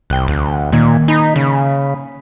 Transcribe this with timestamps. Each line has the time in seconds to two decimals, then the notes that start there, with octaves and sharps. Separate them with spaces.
0.10 C2 G5 F#6
0.28 D2
0.72 A#2 D#3 A#3 G#6
1.08 D#4 G#5 B5 B6
1.36 C#3